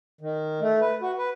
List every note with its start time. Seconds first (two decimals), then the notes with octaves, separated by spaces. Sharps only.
0.21 D#3
0.61 A3
0.81 B4
1.02 F#4
1.18 B4